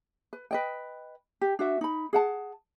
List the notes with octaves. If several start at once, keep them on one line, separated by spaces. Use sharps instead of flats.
B4
B4 D#5 G5
G4
D4 F#4 E5
D#4 B5
G#4 F#5 A5